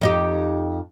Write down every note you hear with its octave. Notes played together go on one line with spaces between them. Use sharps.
F2 D#4 G4